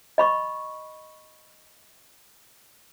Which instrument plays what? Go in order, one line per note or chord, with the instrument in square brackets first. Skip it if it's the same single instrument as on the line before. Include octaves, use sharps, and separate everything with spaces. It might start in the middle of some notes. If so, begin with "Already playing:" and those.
[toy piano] D#5 B5 C#6